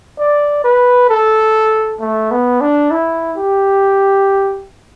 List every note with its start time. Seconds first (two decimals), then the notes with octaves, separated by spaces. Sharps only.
0.18 D5
0.64 B4
1.09 A4
2.01 A3
2.31 B3
2.61 D4
2.91 E4
3.37 G4